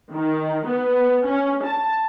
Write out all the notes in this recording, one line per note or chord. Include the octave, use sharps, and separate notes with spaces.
D#3
B3
C#4
A5